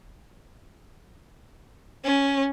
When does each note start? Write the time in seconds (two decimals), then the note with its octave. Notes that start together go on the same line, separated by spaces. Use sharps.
2.03 C#4